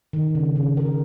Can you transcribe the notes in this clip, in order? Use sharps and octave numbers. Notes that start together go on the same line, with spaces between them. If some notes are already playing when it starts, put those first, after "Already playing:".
D#3
C#3
C#3
A#4